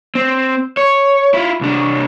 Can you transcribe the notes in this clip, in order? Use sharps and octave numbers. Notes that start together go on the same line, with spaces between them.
C4
C#5
E4 F4
C2 D4